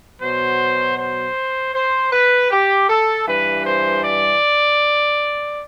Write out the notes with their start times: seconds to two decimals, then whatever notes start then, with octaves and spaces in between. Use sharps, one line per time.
0.21 B2 F#3 C5
0.98 C5
1.74 C5
2.12 B4
2.51 G4
2.89 A4
3.28 G2 E3 B4
3.66 C5
4.04 D5